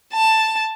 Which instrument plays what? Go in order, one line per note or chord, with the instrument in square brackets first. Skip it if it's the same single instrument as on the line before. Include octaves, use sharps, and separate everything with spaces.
[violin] A5